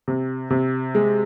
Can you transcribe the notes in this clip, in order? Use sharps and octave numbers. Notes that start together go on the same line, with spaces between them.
C3
C3
G#3